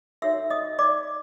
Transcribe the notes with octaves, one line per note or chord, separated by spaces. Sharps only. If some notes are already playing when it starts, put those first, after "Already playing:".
D#4 F#4 A4 C#5 E5 E6
D#5 D#6
D5 D6